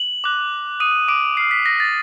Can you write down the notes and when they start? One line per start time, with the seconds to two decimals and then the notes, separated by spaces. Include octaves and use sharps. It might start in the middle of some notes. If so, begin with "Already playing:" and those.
Already playing: F#7
0.24 D6 F#6
0.80 D#6 D#7
1.08 D6 D7
1.37 D6 F6 C7
1.51 B6
1.66 A#6
1.80 A6